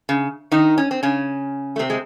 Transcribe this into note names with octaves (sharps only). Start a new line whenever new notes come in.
C#3
D#3 D#4
C#4
C4
C#3 C#4
A3
C3 C4
G#3